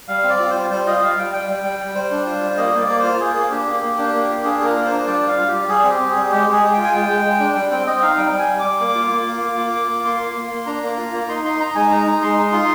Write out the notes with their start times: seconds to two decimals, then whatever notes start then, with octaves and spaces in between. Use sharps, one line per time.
0.08 G3 F5
0.24 C4
0.29 D5
0.40 F4
0.50 C5
0.55 G3
0.70 G3 C5
0.86 F4 D#5
1.02 G3 F5
1.18 G3 G5
1.33 G3 G5
1.49 G3
1.64 G3
1.79 G3
1.95 G3 C5
2.11 D4
2.26 F4
2.42 G3
2.57 A#3 D#5
2.74 A#3 D5
2.88 A#3
3.00 F4 C5
3.19 A#3 G#4
3.36 A#3
3.51 D4 G4
3.66 A#3
3.82 A#3
3.98 D4
4.13 A#3
4.29 F4
4.44 D4 G#4
4.60 A#3 A#4
4.75 F4
4.86 C5
4.92 D4
5.06 G3 D5
5.22 G3
5.27 F5
5.37 F4
5.48 G4
5.53 G3
5.69 G3 G#4
5.84 C4
5.90 G4
6.00 C4
6.10 G#4
6.16 G3
6.30 G#3 G4
6.47 G#3
6.52 G#4
6.63 G#3
6.73 F4 G5
6.84 G#5
6.93 G#3 G5
7.08 G#3
7.25 G#3
7.40 D4
7.55 G3 G5
7.71 C4 G5
7.86 C4 D#5
8.02 D#4 F5
8.17 G3 G5
8.33 G3
8.39 G#5
8.49 G3
8.59 G3 D6
8.80 A#3
8.95 F4
9.10 A#3
9.26 F4
9.42 A#3
9.57 F4
9.74 A#3
9.89 F4
10.04 A#3 C6
10.20 A#3
10.35 A#3
10.52 A#3
10.66 D4 A#5
10.83 A#3
10.98 F4
11.13 A#3
11.28 D#4 C6
11.45 D#4 C6
11.60 D#4 A#5
11.75 G#3 G#5
11.91 D#4 A#5
12.07 D#4
12.22 G#3 C6
12.38 D#4
12.53 F4 C6